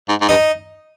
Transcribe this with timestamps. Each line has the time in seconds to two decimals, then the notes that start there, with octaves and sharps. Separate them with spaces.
0.09 G#2
0.21 G#2
0.29 G2 D#4